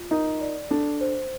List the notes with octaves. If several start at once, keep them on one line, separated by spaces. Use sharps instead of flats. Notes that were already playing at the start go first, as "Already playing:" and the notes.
Already playing: F4
D#4 A#4
D5
D4 A4
C5